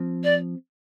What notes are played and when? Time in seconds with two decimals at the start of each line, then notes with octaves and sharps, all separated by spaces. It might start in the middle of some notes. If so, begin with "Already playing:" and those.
Already playing: F3 C4
0.24 D5